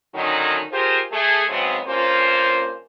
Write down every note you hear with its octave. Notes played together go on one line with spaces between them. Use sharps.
D3 D#3 F#3 A3 C#4 D#4
F4 G4 G#4 A#4 C5
A3 G#4
G#2 C#3 F#3 B3 C4
G2 A#3 C#4 F4 C5